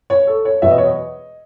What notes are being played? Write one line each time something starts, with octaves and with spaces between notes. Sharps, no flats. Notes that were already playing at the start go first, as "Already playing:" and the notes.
C#5
A4
C#5
E2 B2 F#3 E5
D#5
C#5
D#5